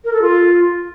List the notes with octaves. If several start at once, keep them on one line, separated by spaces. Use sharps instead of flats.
A#4
A4
F4